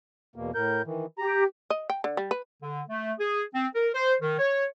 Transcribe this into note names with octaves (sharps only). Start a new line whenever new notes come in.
E2 B2 A#3
A2 A#4 G6
D#3 E3
G4 A#5
D#5
G5
D3
G3
B4
D3
A3
G#4
C4
A#4
C5
D#3
C#5